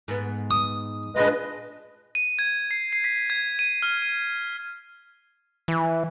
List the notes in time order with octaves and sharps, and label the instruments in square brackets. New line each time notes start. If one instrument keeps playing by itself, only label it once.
[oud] G#2 B3
[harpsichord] D#6
[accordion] G#3 B4 D#5 [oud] D4 F4
[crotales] D#7
G#6
C7
C7
B6
G#6
D#7
F6
D#7
[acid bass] E3